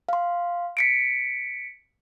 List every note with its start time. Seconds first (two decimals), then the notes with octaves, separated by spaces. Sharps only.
0.09 F5 C6
0.77 B6 C#7 D7